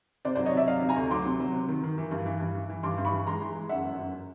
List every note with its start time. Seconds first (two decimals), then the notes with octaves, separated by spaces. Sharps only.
0.25 C3 C5 D5
0.36 C5 D5
0.39 F#3
0.46 C#5 D#5
0.53 C3 D5 E5
0.67 F#3 D#5 F5
0.82 C3
0.89 G#5 A#5
0.96 D2
1.11 F#3 C6 D6
1.25 C3
1.40 F#3
1.55 C3
1.68 D#3
1.84 D#3
1.98 E3
2.11 G2
2.26 E3
2.40 G2
2.55 E3
2.70 E3
2.83 G2 C6 D6
2.98 G2
3.05 B5 C#6
3.12 E3
3.27 G#3 A#5 C6
3.42 E3
3.55 G#3
3.69 F#2 E5 F#5
3.85 G1
3.99 F#2